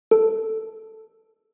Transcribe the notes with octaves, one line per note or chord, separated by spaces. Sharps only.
A4